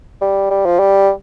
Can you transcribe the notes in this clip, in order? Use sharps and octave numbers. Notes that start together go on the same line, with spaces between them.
G3
G3
F3
G3